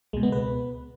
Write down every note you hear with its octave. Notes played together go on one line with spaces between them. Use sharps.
C#2 B2 G#3
B3
B4